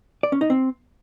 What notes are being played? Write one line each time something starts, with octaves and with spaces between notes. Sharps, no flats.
D5
C#4
D#4
C4